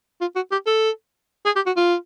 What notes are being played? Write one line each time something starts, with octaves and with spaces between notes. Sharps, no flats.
F4
F#4
G4
A4
G#4
G4
F#4
F4